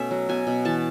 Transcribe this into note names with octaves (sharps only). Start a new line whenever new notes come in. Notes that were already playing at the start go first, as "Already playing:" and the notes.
Already playing: B2 A3 C#4 E5
F#3
B2 G#5
B2
E3 A5